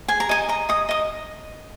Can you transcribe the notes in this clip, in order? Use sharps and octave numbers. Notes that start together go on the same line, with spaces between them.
G#4 G#5
A#5
D#5 G#5
D#5 A#5
D#5 D#6
D#5 D#6